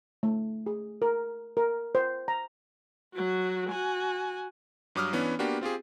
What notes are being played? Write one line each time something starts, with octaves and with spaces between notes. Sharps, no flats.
A3
G#4
A#4
A#4
C5
A#5
F#3 F#4
F#4 G#5
G2 F#3 D6 D#6 F6
E3 B3 C#4 D4
A#3 B3 D4 F#4 G4
C4 F4 G4 G#4